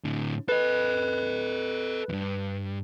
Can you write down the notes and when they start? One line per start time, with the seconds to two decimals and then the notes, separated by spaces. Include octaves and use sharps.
0.04 A2 D3
0.49 A4 B4 D#5
2.09 E2 G2